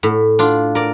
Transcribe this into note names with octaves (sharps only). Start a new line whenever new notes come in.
A2
D4 F4
A#4 D5